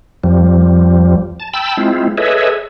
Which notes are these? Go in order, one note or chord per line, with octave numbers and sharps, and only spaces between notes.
F2 F3 G3
A5
G5 A5 B5 E6
G#3 C4 E4 F4
G#4 A4 B4 C#5 D#5 E5